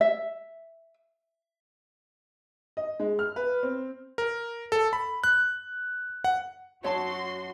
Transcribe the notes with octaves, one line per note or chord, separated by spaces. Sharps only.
E5
D#5
G#3
F6
B4
C4
A#4
A4
B5
F#6
F#5
F#2 F#4 C#5 A5 C6